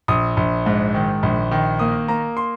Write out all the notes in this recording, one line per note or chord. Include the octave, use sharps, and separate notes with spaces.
A#1 D#6
A#1
G#2
D#3
A#1
D#3
A#3 D#6
A#3 A#5
C6